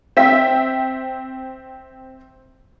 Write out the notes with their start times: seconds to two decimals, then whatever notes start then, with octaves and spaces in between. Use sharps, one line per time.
0.17 C4 E5 B6